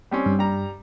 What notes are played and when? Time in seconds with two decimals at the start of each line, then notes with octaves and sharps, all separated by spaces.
0.11 G3 C4 C#4
0.26 G2
0.39 G3 A#5